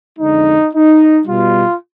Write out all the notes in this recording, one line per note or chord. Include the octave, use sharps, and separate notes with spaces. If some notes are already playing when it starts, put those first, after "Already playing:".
F2 D3 G#3 D#4
D#4
B2 G3 F4